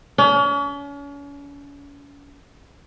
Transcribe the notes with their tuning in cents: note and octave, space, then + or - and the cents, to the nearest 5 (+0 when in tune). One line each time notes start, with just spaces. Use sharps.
C#4 +40